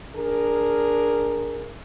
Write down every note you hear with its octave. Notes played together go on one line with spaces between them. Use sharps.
D4 G#4 A#4